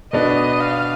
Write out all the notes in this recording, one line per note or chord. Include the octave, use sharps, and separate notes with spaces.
B2 B3 D4 D#5
F5